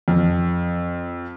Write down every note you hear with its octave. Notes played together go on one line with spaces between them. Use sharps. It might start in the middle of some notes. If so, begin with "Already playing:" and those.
F2